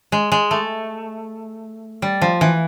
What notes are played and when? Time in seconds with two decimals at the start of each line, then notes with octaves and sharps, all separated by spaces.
0.12 G#3
0.32 G#3
0.51 A3
2.02 G3
2.22 F3
2.41 E3